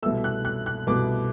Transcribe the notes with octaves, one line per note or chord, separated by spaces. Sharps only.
C2 B2 A3 E6
F#6
F#6
F#6
C2 B2 A3 D6